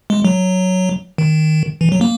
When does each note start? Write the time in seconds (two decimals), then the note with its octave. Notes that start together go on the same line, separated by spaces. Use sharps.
0.10 G#3
0.25 F#3
1.18 D#3
1.81 E3
1.92 F#3
2.01 A#3